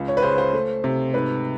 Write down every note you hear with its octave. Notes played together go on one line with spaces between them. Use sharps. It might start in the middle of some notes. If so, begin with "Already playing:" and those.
Already playing: C#2
C#5
B4
C#3 C5
C5
A3
C3
G#2 B4